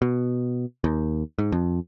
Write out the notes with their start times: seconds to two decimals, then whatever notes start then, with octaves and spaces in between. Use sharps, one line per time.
0.02 B2
0.84 D#2
1.38 G#2
1.52 F2